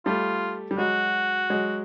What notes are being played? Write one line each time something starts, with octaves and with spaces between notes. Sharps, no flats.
G3 A3 F4
G3
F#3 G#3 F#4
F#3 G#3